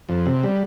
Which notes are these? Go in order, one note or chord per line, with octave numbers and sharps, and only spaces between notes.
F2
C3
G3